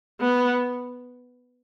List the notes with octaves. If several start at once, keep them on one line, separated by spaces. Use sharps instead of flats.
B3